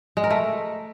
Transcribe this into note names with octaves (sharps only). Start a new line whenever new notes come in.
G#3
A#4
A3